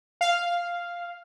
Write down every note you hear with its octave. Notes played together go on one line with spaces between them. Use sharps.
F5